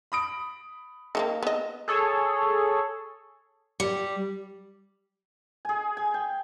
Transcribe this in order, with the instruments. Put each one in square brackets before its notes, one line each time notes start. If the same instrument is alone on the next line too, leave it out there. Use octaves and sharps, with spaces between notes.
[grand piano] B5 D#6 D7
[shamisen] D#3 A3 A#3
B3 D#5
[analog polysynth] G#4 A4 C#5
[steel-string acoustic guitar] G3
[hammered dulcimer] G#4 G#5
G#5
G5